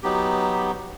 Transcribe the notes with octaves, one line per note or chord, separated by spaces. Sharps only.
F#3 B3 D#4 G4